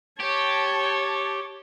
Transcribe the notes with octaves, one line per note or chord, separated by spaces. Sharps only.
G4 C#5 A5